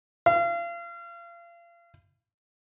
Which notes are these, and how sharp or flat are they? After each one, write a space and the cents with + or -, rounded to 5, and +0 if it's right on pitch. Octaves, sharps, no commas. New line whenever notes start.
F5 -35